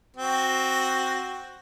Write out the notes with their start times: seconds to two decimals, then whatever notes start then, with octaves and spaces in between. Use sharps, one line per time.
0.17 C4 F#4